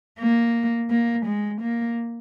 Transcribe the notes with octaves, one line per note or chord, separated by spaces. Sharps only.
A#3
A#3
G#3
A#3